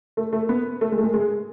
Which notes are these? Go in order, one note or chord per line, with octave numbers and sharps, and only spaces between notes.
A3
A3
B3
A3
G#3
A3
G#3
G#3